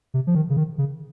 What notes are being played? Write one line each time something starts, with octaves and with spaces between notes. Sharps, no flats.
C3
F3
D#3
C#3
D#3
C#3